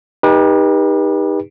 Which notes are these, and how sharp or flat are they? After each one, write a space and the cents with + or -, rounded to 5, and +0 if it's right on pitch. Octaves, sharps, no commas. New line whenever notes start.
D#4 +0 G4 +30 B4 -30